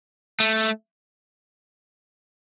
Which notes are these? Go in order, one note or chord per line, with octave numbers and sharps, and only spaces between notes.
A3